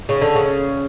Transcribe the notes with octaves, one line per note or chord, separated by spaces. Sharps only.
C#3
D3
C#3